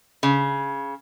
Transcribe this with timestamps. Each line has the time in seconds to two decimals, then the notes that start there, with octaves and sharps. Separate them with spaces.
0.23 C#3